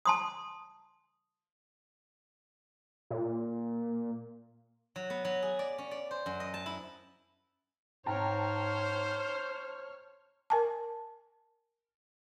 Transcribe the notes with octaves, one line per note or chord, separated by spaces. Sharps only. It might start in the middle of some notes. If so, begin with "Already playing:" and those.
A5 C6 D#6
A#2
F#3
B3
F#3
G#4
D5
C#4
D5
C5
F#2
D#5
A5
E4
G#2 C5 C#5 G5 A5 A#5 F6
A#4 G#5 A5